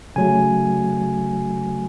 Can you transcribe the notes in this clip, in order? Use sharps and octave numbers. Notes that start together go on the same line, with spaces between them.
C#3 F#3 A3 G#5